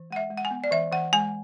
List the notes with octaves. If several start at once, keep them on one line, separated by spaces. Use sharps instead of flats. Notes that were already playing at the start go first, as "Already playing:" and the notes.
Already playing: E3
G#3 F#5
E5
G#3
F#5
G#5
B3
D5
E3 E5
E3 F#5
G#3 G#5